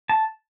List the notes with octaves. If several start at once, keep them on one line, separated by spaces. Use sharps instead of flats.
A5